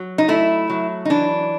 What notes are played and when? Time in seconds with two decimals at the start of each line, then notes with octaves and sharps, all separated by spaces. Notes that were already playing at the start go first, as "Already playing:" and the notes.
Already playing: F#3
0.18 D#4
0.28 A3 E4
0.70 F#3
1.05 D#4
1.10 E3 D4